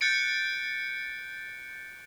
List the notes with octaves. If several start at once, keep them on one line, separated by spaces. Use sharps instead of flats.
F#6 G6 A6 C#7 D7